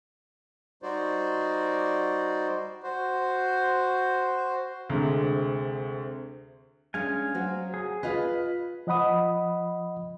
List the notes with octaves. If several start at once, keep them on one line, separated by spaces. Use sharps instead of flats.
G3 D#4 F#4 C5 D5
F#4 C5
D2 C3 G#3
G#3 C#4 D4 F5 G#5
F#3 F#4 C5
G#4
F4 G#4 B4 D#5
F3 D#5 F#5 B5 D#6